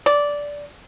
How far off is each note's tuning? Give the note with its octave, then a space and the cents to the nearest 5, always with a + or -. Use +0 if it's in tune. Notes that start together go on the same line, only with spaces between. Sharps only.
D5 -10